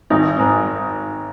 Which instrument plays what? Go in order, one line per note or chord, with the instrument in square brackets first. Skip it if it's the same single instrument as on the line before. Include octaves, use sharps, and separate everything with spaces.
[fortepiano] G#1 D#4
G#2